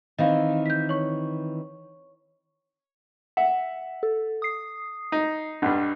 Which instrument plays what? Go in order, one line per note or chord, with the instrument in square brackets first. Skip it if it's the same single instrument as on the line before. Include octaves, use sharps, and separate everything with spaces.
[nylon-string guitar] D#3 E3 C4 [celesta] D#5 F5
[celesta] G6 B6
C#5 C#6
[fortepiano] E5 [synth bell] F#5
[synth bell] A4
D#6 C7
[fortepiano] D#4
[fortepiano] B1 G2 [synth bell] D4